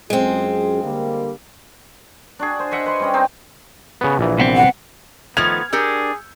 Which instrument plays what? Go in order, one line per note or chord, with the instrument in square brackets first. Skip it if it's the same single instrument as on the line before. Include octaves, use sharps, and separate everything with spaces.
[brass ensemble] F#2 F4 G#4 [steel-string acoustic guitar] G#3 C4
[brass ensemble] D3 G3 A#3
[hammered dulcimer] D4 F#4 G#4
C5
D#5 E5 F#5
B4 C6
G3 C#4 D#5
C4 D#4
[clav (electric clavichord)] C#3 B3
A#1 E3
[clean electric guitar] C2 B3 C4
[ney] F#5
[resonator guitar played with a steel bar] D#3 F3 A3 [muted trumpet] B3 [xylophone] F6 [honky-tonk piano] G#6 F7
[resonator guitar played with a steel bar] D4 G4 A#4 [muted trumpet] G#4 [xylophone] E6 G6 C#7